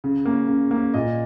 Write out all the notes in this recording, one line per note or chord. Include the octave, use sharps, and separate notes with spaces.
C#3
A#3 C#4
C#3
A#3 C#4
A#2 D#5